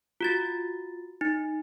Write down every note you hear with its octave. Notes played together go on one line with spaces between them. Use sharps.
F4 F#4 A6
D#4